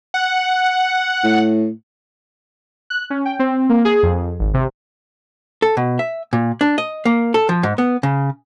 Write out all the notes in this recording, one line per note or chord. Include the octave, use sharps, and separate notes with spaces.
F#5
A2
F#6
C#4
G5
C4
A#3
G#4
F2
G#1
C3
A4
B2
E5
A#2
D4
D#5
A#3
A4
F3
G#2
B3
C#3